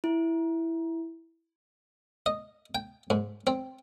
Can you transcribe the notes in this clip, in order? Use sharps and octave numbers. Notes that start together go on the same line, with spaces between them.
E4
D#5
G5
G#2
C4